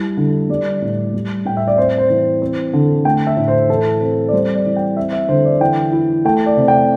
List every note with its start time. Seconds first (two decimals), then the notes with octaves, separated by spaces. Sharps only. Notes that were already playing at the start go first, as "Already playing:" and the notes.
Already playing: G3 E4
0.17 D3
0.49 G3 D5
0.82 A2
1.14 G3
1.45 A2 G5
1.57 E5
1.68 D5
1.77 C4 C5
1.98 C5
2.10 E3
2.42 C4
2.73 D3
3.05 A3 G5
3.27 E5
3.37 A2
3.48 C5
3.69 E3 A4
4.01 C4
4.28 D5
4.33 G3 C5
4.55 D5
4.66 E3
4.76 G5
4.97 C4 E5
5.13 E5
5.29 D3 C5
5.45 D5
5.60 E3 G5
5.92 E4
6.25 A3 G5
6.46 D5
6.57 C3
6.68 G5